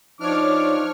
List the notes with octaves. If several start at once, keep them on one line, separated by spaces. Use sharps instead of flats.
F3 D4 D#4 C#5 D6 F6